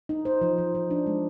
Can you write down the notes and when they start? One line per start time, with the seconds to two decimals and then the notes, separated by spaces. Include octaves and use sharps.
0.09 D#4
0.25 C5
0.41 F3
0.58 F3
0.75 F3
0.91 D4
1.07 G#3